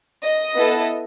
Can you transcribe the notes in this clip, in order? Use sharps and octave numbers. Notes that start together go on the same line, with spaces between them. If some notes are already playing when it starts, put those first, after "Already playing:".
D#5
B3 E4 A4